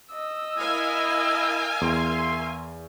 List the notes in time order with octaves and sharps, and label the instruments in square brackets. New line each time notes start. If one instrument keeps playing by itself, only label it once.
[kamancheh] D#5 E6
[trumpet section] E4 [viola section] A#4 F5 G#5
[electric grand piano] E2 [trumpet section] E5 C6